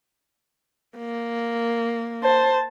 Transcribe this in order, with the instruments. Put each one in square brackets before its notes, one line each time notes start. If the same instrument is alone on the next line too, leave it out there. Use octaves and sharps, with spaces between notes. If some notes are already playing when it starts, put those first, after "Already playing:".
[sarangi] A#3
[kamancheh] C5 A5